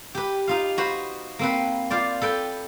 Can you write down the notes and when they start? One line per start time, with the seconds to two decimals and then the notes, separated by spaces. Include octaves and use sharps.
0.15 G4 B4
0.47 D#4 F4 F5
0.78 F#4 B4 C5
1.39 A#3 C4 B4
1.90 F4 C5 D5
2.21 A4 B4 G5